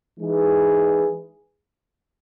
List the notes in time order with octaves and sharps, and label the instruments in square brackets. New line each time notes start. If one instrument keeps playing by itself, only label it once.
[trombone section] E3 G#3 D#4 G#4 B4